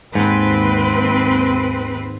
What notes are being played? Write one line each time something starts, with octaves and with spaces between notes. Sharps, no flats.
D#2 G#2 C4 B4